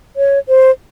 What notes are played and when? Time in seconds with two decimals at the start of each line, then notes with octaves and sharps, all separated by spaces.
0.16 C#5
0.48 C5